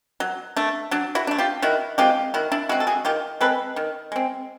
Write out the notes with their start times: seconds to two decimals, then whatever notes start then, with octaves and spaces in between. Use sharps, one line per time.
0.20 F#3
0.56 A3 D4
0.91 F#3 D4
1.15 E4 F#4
1.27 A3 D4
1.38 F4 G4
1.62 D#3 E4 F#4
1.98 G#3 C4 F4 G4
2.34 D#3 E4 F#4
2.52 D4 E4
2.69 G#3 C4 E4 F#4
2.80 A4
2.87 F#4 G#4
3.05 D#3 F4 G4
3.41 G#3 C4 A4 B4
3.76 D#3
4.12 G#3 C4